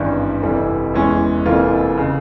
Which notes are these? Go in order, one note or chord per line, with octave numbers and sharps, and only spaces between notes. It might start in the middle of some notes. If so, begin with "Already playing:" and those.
Already playing: G#1 G2 E3 G3 C#4
F1 F2 E3 G3
E2 E3 G#3 C#4
F1 F2 E3 A#3 F4
C#3